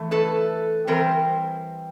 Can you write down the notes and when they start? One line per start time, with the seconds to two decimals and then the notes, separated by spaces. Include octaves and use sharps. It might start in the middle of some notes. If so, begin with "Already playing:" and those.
Already playing: E3 A3
0.11 A4 B4
0.87 E3 G3 C4 A#4 C5